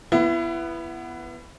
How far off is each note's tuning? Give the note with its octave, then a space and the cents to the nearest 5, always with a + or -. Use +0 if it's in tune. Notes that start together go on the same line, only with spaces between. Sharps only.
B3 +0 E4 +30